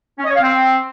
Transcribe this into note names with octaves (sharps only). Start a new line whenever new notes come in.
C#4
D#5
C#5
F5
C4